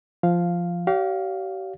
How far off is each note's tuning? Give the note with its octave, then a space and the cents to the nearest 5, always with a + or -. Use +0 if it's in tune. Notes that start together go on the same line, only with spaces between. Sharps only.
F3 -10 F5 +0
G4 -40 C#5 +45 F5 +0